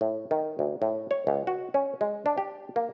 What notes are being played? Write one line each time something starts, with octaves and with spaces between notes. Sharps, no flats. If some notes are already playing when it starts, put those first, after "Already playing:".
A2
D#3
D2
A2
C#5
C#2
F#4
C#4
G#3
D4
G4
A#3